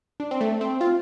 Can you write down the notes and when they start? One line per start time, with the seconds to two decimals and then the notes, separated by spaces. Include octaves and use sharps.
0.20 D4
0.31 C4
0.41 A3
0.61 C4
0.81 F4